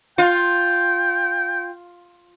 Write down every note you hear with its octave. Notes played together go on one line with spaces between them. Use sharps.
F4 G5